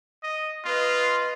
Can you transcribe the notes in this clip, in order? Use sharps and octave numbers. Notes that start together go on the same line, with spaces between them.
D#5
F4 B4 D#5